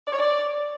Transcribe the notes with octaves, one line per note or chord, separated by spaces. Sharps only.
D5
C#5
D5